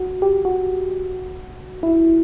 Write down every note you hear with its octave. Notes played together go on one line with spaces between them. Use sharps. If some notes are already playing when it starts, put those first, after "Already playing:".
Already playing: F#4
G4
F#4
E4